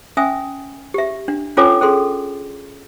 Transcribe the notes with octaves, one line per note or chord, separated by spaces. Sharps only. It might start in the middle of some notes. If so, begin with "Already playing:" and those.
C#4 E5 G#5 D#6
G4 E5
D4
C#4 F4 A4 C#5 G#5 D6
C#4 G#4 A4 C6